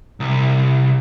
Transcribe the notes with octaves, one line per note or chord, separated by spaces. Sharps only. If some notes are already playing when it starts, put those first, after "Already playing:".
C2